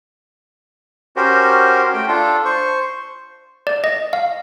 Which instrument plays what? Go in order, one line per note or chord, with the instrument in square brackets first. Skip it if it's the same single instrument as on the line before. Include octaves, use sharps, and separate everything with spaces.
[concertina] C#4 F#4 G4 A#4 C5
A3 G5
D4 F4 A4
C5 C#6
[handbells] D5
D#5
F5